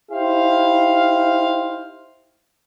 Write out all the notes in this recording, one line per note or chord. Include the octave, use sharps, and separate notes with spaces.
D#4 E4 G4 C5 F5